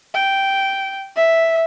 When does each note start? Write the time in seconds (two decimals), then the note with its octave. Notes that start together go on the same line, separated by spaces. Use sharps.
0.14 G5
1.16 E5